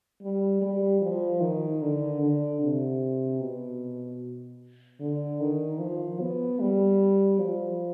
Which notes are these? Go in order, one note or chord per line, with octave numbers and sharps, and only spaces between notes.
G3
G3
F3
D#3
D3
D3
C3
B2
D3
D#3
F3
B3
G3
F3